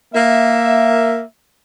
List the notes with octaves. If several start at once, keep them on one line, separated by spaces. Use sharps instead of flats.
A#3 E5